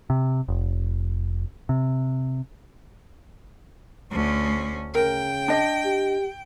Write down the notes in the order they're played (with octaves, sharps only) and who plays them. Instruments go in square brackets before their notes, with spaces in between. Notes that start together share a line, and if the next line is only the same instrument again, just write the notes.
[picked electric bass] C3
F1
C3
[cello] D2 C#4
[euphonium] C#3 [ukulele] A#4 [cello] G5
[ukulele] D4 D#5
[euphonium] G4